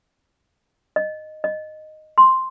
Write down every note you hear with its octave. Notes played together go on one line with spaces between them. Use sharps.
D#5
D#5
C6